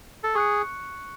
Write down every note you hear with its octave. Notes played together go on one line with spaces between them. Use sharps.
A4
G#4 C#6 F#6 C#7